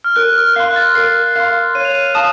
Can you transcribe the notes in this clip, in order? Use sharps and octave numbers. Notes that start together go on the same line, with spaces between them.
F6
A#4 F#6
F6
F5 C6 F#6
F#6
A6
A#4 C7
F5 C6
C#5 D#7
F7
D#7
F5 A5 D#6